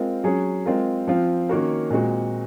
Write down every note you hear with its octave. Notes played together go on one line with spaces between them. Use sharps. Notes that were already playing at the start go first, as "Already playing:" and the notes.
Already playing: G#3 C4 F4 A#4
F#3 C#4 G#4
G#3 C4 F4 A#4
F3 C4 F4
D#3 A#3 C#4 F#4 A#4
A#2 G#3 C4 F#4